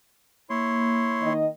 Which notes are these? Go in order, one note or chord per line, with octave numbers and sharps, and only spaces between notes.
A#3 E4 C#5 C6
D#3 D#5